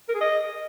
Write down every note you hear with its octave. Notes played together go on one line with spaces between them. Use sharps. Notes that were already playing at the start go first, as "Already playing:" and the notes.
A#4
G#4
D#5